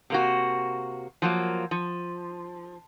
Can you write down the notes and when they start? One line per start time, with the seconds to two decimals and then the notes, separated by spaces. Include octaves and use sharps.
0.10 C3 A#3 F#4
1.22 F3 F#3 A#3
1.71 F3